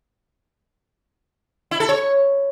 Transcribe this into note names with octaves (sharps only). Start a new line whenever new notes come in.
E4
A4
C#5